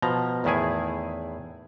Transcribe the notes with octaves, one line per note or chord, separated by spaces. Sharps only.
B2 F3 A#5
E2 A2 D#3 E4 G#4 G#5